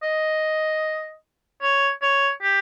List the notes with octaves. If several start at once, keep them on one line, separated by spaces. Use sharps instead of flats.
D#5
C#5
C#5
G4